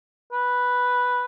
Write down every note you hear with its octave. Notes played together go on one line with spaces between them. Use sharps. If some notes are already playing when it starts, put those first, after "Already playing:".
B4